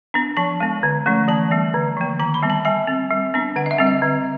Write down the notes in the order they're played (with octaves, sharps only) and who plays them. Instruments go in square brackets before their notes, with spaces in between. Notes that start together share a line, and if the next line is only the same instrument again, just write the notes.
[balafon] B3 D4
F3 A5
G#3 B3
D3
F3 A3 C#4
E3 A5
G3 B3
D3
F3 A#3
D#3 A#5
B5
G3 B3
A5
G3 G#5
C4
G3
B3 D4
D3 F#5
D#5
E5
G3 C4
D#5
D3